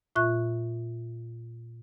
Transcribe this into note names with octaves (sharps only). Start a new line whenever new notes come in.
A#2 F4 E5 C#6 F#6